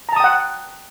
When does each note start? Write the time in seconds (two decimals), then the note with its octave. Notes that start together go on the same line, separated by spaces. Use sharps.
0.09 A#5
0.12 A5
0.16 D#6
0.20 G5
0.24 F#5